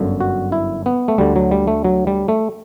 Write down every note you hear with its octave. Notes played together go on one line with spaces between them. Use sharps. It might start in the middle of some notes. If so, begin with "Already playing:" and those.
Already playing: G1 F#2 D3
F#4
E4
B3
A3
D2 D3 G3
F#3
G3
A3
F#3
G3
A3